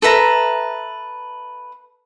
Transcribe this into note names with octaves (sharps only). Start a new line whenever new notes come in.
A4 B4 E5 A#5